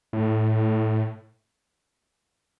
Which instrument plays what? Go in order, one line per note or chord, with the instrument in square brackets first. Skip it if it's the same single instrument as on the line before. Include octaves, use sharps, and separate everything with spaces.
[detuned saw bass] A2